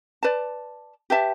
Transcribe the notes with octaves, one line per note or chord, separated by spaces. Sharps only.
B4 D5 A5
G4 B4 E5 A5